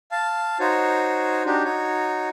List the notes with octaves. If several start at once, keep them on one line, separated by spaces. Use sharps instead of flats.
F5 A5
D#4 F#4 C5 C#5
D4 D#4 F#4 G4
D#4 F#4 C#5